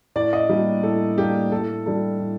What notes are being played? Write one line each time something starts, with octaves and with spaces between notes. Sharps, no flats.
A2 D5
D#5
G3 A#3 D4
A2 A4
G3 A#3 D4 G4
A2 A4
G3 D4 A4
A2